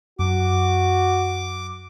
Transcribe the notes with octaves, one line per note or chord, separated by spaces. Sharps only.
F#2 F#4 D6